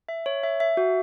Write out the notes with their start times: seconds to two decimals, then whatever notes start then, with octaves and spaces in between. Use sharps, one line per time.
0.09 E5
0.26 C#5
0.43 E5
0.60 E5
0.77 F#4